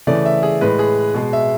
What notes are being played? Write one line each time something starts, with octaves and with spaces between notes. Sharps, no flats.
C#3 E3 A3 D5
E5
G#4
A2 G#3 B4
G#4
B2 G#3
E5